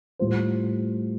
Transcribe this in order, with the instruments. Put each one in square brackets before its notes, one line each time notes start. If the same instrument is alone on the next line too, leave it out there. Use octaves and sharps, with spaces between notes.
[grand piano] A2 G3 F4 C5